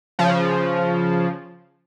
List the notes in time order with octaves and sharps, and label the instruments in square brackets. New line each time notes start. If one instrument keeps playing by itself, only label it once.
[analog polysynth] C#3 F3